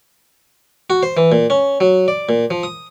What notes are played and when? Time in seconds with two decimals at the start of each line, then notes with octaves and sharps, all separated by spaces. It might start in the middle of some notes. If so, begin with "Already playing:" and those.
0.90 F#4
1.03 C5
1.17 E3
1.32 A#2
1.50 C#4
1.80 F#3
2.08 D5
2.29 A#2
2.50 F3
2.63 D#6